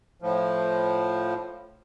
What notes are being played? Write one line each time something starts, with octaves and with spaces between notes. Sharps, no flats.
A2 F3